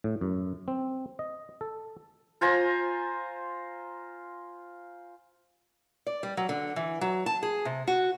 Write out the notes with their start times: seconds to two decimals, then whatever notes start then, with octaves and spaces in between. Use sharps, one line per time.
0.04 A2
0.21 F#2
0.68 C4
1.19 D#5
1.61 A4
2.41 F4 C5 G#5 A#5
6.06 D5
6.23 G3
6.37 F#3
6.49 D3
6.76 E3
7.01 F#3
7.26 A5
7.43 G#4
7.65 C3
7.88 F#4